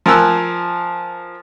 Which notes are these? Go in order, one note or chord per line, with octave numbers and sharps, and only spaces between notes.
F3 A#4 G#5 E6 F#6